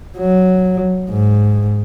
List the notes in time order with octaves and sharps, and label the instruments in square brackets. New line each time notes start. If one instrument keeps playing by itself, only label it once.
[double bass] F#3
G#2